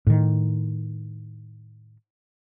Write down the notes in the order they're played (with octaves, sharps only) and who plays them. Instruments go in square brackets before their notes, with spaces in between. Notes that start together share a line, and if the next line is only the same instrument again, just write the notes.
[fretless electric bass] A2 D#3